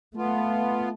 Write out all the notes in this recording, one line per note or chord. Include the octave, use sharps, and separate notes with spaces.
A3 B3 F4